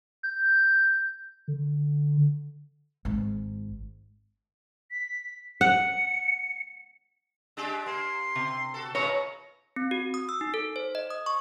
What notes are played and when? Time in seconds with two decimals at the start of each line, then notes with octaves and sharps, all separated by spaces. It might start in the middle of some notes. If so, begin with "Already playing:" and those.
0.23 G6
1.48 D3
3.05 G#1 G#2
4.91 B6
5.61 F#5 C#7
7.57 G#3 D4 G4
7.86 A#3 C6
8.35 C3
8.74 F#4 A4
8.95 A2 G#3 B4 C#5 A#5
9.76 C4
9.91 F#4
10.14 D#6
10.29 E6
10.41 D#4
10.54 A4
10.76 C5
10.95 D#5
11.10 D#6
11.26 C#6